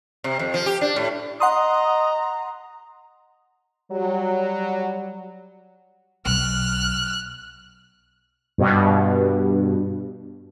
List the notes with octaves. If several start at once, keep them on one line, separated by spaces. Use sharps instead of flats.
C3
F2
F3
G4
D4
A2
D#5 F#5 A#5 C6 D#6
F#3 G3
B1 F6 F#6
G2 B2